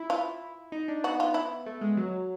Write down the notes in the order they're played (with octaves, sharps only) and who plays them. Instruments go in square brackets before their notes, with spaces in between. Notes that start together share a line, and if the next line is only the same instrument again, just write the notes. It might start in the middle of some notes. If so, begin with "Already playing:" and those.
Already playing: [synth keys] E4
[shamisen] F4
[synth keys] D#4
D4
[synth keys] B3 [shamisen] F#4
[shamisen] F4
E4
[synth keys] A3
G#3
F#3